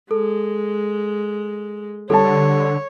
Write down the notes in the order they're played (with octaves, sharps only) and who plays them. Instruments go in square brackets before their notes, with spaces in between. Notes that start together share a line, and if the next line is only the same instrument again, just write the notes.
[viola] G#3 [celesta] A4
[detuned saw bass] D3 [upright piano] G3 A5 [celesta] A4 [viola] C#5